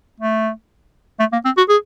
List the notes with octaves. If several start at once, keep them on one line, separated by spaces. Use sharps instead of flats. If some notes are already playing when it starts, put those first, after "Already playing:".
A3
A3
A#3
C4
F#4
G#4